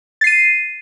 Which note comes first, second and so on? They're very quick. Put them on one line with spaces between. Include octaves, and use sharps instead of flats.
A6 C7 D#7